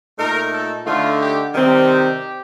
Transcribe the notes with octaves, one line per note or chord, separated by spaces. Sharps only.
A#2 A3 D#4 A#4
A4
D3 A3 D#4 F4
G4
C3 D#3 G3 C4 D#4 G4